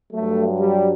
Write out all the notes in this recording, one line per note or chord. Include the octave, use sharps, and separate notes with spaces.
G2 F#3 A3
G3